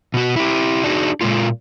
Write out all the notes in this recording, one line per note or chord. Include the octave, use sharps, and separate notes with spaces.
B2 F#4
E4 F4 G4
D4 D#4 F#4 G#4
A#2 G#3 A#3 F4